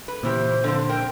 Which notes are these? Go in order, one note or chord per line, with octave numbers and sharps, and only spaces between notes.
B4
A#2 C#3 E3 G4 C5
D3 F3 C4
A#4 C5 G5